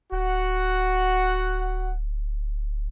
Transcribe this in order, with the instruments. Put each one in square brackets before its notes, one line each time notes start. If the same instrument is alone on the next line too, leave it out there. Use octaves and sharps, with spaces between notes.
[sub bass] D1 [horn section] F#4 F#5